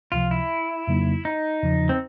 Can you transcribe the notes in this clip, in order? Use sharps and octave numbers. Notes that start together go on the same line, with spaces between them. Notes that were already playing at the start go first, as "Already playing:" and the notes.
C#2 C3 F3 F4
E4
F2 C#3 F#3 A#3 D#4
D#4
E2 C#3 F3
C4